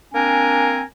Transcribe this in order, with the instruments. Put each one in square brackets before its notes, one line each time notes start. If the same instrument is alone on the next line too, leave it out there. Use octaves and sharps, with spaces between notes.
[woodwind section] A#3 C4 D4 A#4 G#5